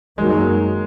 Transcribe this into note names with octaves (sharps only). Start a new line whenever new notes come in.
F#2 D#3 F#3 G#3 A#3